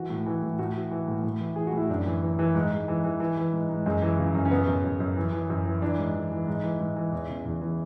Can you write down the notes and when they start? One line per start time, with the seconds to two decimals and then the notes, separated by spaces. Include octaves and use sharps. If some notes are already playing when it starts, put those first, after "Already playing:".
Already playing: E3 F#4
0.10 A2
0.26 E3
0.43 A2
0.59 A2 F#4
0.75 E3
0.91 E3
1.08 A2
1.24 A2
1.40 E3
1.56 E3 G#4
1.67 F#4
1.73 A2 E4
1.90 F#2 D4
2.06 E3
2.22 E3
2.39 E3
2.55 G#2
2.71 G#2
2.88 E3
3.04 E3
3.20 E3
3.37 E3
3.53 G#2
3.69 G#2
3.86 F#2 G#3
4.02 E3
4.19 C#3
4.35 F#2
4.45 C#4
4.51 C#3 B3
4.67 F#2
4.84 F#2
5.00 F#2
5.16 E3
5.32 E3
5.50 F#2
5.66 E3
5.82 E3 D4
5.98 G#2
6.15 E3
6.32 E3
6.47 G#2
6.64 E3
6.80 G#2
6.96 E3
7.12 E2
7.28 C#3
7.45 E2
7.62 E3